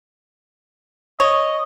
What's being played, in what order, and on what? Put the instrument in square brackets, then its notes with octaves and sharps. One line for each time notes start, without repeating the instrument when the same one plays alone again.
[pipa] C#5 [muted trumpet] D#5